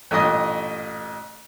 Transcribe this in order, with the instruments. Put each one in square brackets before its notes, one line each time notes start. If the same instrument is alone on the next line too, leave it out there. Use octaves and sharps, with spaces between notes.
[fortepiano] A1 G2 A#2 D#5 D#6